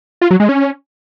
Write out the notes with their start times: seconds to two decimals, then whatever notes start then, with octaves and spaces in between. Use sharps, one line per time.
0.21 F4
0.31 F#3
0.40 G#3
0.49 C#4